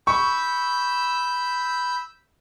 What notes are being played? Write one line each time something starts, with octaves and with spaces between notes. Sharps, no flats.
B5 C#6 E6 G6